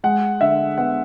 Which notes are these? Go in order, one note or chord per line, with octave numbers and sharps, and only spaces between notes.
G#3 F#5
D3 E5
B3 F#5